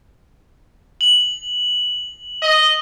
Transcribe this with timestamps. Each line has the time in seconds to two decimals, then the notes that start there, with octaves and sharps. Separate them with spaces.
1.01 F#7
2.42 D#5